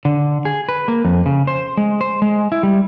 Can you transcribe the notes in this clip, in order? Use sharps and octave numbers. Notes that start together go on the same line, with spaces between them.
D3
G#4
B4
A#3
F2
C#3
C5
G#3
C5
G#3
E4
G3